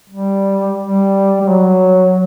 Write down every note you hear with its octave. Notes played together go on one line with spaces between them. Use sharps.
G3
G3
G3
F#3